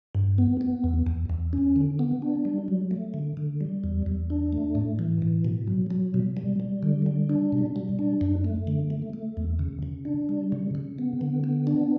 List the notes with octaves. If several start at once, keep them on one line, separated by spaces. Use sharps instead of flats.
G2
B3
B3
E2
E2
E2
C#4
D3
B3
D4
G3
F#3
A3
D3
D3
G3
E2
E2
D4
A3
A2
E3
A2
B2
F#3
F#3
B2
G3
G3
D3
G3
D4
B2
G3
D4
F#2
A3
D3
A3
A3
E2
C#3
C#3
D4
G3
C#3
C#3
B3
D3
B3
D4